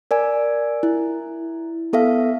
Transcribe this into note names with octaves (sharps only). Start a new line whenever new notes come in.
A#4 D5 G#5
E4
B3 A4 E5 F5